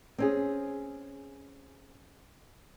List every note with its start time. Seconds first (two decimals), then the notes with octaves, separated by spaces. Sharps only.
0.18 C4 C#4 G#4